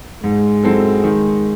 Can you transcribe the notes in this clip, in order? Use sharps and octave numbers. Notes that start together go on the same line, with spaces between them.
G#2 G#3
F#3 C4 E4 A4
D#3